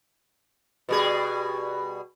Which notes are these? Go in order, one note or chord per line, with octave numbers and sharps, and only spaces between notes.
B2 G3 G#4